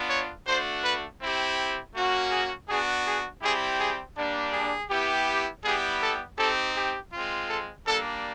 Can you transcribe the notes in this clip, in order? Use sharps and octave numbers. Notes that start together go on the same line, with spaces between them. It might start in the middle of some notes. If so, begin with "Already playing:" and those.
Already playing: B3 D4 F4
C#5
A3 D4 F#4 C5
B4
C4 E4 G4
A#3 C#4 F#4
G#4
B3 D4 F#4 G#4
G#4
G3 C4 E4 G4 G#4
G#4
G3 A#3 D4
G#4
B3 E4 G4
G3 B3 E4 G4 G#4
A4
C4 D#4 G4 A4
G4
G#3 C4 F4
A4
G3 A#3 D4 A4